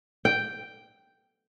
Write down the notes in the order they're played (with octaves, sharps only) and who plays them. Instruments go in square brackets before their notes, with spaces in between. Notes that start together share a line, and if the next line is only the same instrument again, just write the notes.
[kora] G5